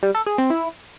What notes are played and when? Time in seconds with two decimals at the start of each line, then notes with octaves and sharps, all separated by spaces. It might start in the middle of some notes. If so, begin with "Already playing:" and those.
0.03 G3
0.15 A4
0.26 G#4
0.38 C4
0.50 E4